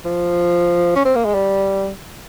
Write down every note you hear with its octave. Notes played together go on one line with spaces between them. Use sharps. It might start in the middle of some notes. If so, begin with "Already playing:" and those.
F3
C#4
C4
A#3
G#3
G3